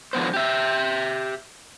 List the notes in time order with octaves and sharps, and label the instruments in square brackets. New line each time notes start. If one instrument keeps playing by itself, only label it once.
[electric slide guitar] D3 F3 B3 C5
G4 E5